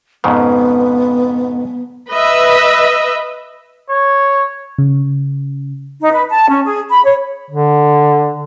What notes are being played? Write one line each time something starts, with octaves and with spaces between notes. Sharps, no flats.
F2 G#2 C#3 B3
B4 D#5 E5
C#5
C#3
D#4
B4
A5
C#4
G#4
B5
C#5
D3